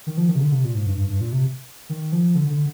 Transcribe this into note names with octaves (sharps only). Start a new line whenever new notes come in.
D#3
F3
D#3
C3
D3
C3
A#2
G#2
G2
G2
G2
A#2
C3
D#3
F3
D3
D3